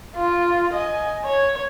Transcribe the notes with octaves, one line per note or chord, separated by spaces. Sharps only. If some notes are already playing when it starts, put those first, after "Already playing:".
F4
D#5 G#5
C#5